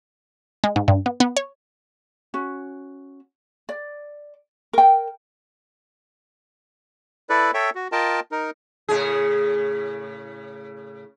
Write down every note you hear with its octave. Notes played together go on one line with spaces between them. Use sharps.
G#3
G#2
G2
B3
B3
C#5
C#4 F#4
D5
A#4 G5
E4 A4 B4 D5
A4 C#5 E5 G5
F#4
F4 A#4 D#5 G5 A5
D#4 A#4
A2 C#3 G#4